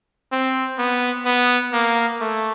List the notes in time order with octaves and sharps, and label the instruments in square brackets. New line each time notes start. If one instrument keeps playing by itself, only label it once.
[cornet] C4
B3
B3
A#3
A3